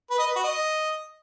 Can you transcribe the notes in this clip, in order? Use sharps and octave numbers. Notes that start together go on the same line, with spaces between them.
B4
D#5
B4
F#4
D#5